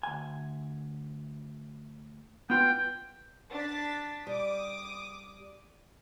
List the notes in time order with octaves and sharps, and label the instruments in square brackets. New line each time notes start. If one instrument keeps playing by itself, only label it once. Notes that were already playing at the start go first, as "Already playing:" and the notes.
[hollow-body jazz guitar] D2 G#5
[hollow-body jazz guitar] B3 F4 B4 [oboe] G5
[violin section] D4 A6 B6
[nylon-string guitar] G3 [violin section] D6 D#6